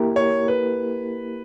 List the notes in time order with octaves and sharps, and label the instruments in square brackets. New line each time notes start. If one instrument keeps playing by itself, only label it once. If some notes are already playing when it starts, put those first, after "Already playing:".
Already playing: [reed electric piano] A#3 E4 G4 A#4
[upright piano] C#5
B4